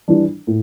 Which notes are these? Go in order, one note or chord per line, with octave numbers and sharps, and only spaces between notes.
E3 G3 D4
A2